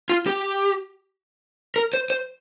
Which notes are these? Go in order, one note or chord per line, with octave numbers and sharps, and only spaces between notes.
F4
G4
A#4
C5
C5